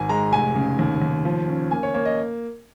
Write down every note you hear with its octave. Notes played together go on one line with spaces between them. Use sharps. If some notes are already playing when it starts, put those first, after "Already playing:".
Already playing: G#1 G#5
G#3 A#5
F1 G#5
C#3
D#2
D#2
F3
C#4
A#3 G#5
C#5
A#3 C#5
D#5